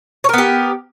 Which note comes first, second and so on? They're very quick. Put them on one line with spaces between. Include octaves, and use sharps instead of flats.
C#5 A#4 B3 G4